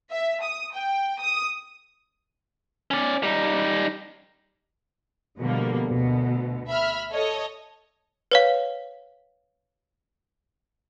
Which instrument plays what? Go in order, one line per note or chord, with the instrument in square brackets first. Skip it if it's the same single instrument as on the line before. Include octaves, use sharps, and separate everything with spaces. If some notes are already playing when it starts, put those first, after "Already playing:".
[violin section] E5
D#6
G5
D#6
[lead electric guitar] C#4 D5
G3 D#4
[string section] B2 D3 F3 G3 A#3
D2 B2
E5 B5 F6
A4 C#5 D#5
[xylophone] B4 C#5 F5